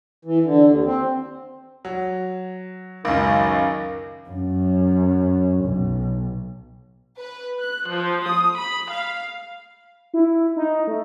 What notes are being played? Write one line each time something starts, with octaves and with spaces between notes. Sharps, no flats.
E3
D3
D#2
C4
F#3
C#2 F#2 D#3
F#2
B1
B4
F#6
F3
D#6
B5
F5
E4
D#4
A3